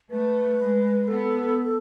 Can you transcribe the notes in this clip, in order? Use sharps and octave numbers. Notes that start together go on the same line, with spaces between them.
A3 B4
G#3
B3 A4